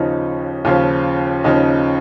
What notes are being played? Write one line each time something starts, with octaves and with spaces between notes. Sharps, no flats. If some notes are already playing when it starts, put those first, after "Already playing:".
Already playing: D#2 C#3 F3 D#4
D#2 C#3 F3 F4
D#2 C#3 F3 D#4